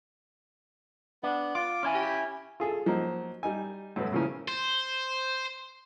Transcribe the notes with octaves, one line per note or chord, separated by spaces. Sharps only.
B3 D4
F4 D6
C#4 E4 G#5
G4
F4 G#4 A4
F3 F#3 A#3 D#4
G3 D#4 G#5
F#2 B2 F#3 A3 B3
A2 C#3 E3 F3 A#3 C#4
C5